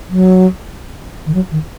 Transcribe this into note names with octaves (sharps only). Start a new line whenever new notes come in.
F#3
D#3
F#3
D#3